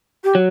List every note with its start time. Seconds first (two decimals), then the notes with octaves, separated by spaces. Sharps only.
0.24 G4
0.35 F#3